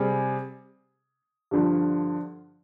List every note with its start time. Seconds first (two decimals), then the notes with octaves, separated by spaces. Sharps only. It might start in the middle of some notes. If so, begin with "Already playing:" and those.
Already playing: C3 G3 G#4
1.51 G2 D3 F3